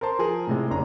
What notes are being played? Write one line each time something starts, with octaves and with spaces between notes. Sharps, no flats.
A#4 C5 A5 C6
F3 G#4 A#4
A2 C3 G#3
F#1 C#4 D4 A#5